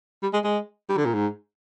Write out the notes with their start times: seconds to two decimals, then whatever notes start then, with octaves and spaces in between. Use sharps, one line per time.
0.23 G3
0.33 G#3
0.44 G#3
0.89 G3
0.97 D3
1.06 A#2
1.14 G#2